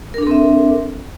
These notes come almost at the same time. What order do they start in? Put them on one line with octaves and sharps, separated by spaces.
A#4 D4 A4 C4 E5